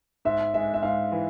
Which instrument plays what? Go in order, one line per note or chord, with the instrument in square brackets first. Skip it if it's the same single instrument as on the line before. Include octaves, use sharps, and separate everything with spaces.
[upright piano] G#2 [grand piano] E5
[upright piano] G#3 [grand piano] E5
[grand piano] E5
[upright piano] G#2 [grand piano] F5
[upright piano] E3